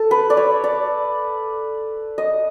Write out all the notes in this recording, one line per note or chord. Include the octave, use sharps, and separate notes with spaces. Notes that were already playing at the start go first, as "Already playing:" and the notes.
Already playing: A4
B4
D5
C#5
D5
D#5